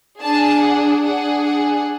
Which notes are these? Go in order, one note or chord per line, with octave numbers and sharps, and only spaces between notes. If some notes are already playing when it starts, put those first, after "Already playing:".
D4 G#4 A5
F#5
D4 G#4 F#5
F#5